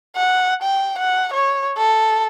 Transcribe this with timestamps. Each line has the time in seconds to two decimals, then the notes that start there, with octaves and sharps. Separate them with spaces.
0.16 F#5
0.63 G5
0.99 F#5
1.34 C#5
1.78 A4